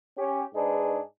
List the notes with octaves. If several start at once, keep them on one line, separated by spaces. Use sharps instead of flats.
C#4 G4
G#2 D4 D#4 G#4 B4